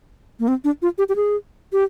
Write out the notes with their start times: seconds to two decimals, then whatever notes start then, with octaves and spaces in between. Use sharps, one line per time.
0.39 A#3
0.48 C4
0.64 D4
0.82 F4
0.98 G4
1.09 G4
1.16 G#4
1.73 G4